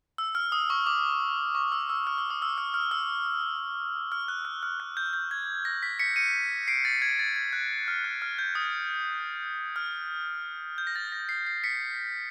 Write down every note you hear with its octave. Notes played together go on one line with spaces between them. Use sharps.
E6
F6
D#6
C#6
D6
C#6
E6
E6
F6
E6
D#6
E6
F6
F6
E6
F6
F#6
F6
F6
F#6
G6
G6
G#6
A#6
B6
B6 C#7
C#7 D#7
C7 D7
A6
G#6
A6
G#6
F#6
F6
F#6
F6
G6
D#6
F6
G6
A#6
A6
A#6
C7
C7
B6 C#7